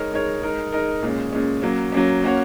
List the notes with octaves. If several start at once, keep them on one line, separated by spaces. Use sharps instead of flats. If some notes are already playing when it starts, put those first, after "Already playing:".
Already playing: G#3 D#4 A#4 C#5
G#3 D#4 A#4 C#5
G#3 D#4 A#4
G#3 D#4 A#4
A#2 G#3 C#4
A#2 G#3 C#4
F#3 A#3 C#4
F#3 A#3 C#4
A#3 C#4 F#4 C#5